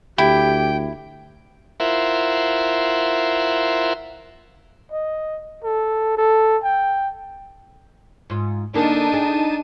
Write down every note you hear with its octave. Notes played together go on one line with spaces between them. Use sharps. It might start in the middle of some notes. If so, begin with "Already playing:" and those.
D2 E4 G4 G5
E4 F4 A#4 C5 E5 F#5
D#5
A4
A4
G5
G#2 F4
D3 A#3 D4 D#4 G#4 A5 D#7
G#4